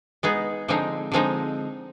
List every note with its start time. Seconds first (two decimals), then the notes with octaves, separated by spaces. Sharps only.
0.23 G#3 B3 D#4 G#4
0.68 D3 F3 G#3 C4 D#4
1.12 D3 F3 G#3 C4 D#4